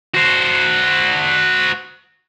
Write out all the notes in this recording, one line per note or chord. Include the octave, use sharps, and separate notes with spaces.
F#4 C5